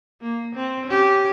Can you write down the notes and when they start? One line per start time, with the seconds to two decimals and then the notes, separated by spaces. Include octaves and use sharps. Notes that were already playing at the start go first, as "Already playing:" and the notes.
0.21 A#3
0.55 C4
0.86 C#4 G4